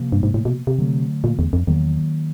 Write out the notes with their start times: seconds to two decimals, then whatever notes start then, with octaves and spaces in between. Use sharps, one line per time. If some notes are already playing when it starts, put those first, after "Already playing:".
Already playing: C3 F3 A#3
0.12 G2
0.23 G#2
0.34 A2
0.45 B2
0.67 C3
0.78 D3 F#3 A3
1.24 A#2
1.39 E2
1.53 F2
1.67 E2 D#3 F#3 A#3